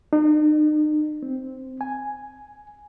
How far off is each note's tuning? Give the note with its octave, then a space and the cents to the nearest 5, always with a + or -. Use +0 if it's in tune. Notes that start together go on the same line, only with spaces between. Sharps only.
D#4 -40
C4 -5
G#5 +0